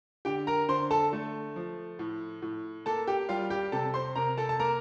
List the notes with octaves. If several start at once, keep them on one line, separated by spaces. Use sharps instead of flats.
D3 G4 G5
A#4 A#5
D3 C5 C6
A4 A5
A3
F3
A2
A2
A#3 A4 A5
G4 G5
G3 F4 F5
G4 G5
C3 A4 A5
C5 C6
C3 A#4 A#5
A4 A5
A5
A#3 A#4 A#5